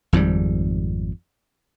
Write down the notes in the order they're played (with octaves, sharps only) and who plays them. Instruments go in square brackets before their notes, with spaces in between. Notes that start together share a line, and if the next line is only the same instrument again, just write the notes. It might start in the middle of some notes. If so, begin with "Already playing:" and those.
[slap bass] G#1 F2 G#2 G3